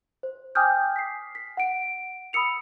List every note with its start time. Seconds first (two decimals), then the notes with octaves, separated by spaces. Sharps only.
0.23 C5
0.55 G5 G#5 D6 D#6 F6 G6
0.96 B6 C7
1.35 B6
1.57 F#5 D7
2.33 B5 D#6 E6 C#7 F7